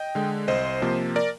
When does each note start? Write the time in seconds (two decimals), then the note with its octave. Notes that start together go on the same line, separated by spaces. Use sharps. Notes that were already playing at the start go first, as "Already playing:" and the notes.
Already playing: D#5 G5
0.15 D3 G#3
0.48 C2 C5 D#5
0.82 C3 F3 A#3
1.16 A#4 D5